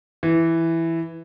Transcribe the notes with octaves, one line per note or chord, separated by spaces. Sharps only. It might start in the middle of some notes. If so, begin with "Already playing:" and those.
E3